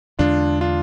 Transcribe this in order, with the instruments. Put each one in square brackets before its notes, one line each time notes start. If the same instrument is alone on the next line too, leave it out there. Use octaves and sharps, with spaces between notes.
[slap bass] E2 D3 G#3 [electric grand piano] D4 F4
[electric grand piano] D4 F4